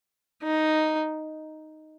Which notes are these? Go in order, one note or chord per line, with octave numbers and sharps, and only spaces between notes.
D#4